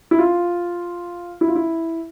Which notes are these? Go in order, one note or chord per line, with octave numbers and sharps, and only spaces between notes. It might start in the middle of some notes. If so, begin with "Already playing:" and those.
E4
F4
E4
F4
E4